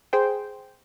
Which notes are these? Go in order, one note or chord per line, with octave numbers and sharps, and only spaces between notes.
G#4 C5 G5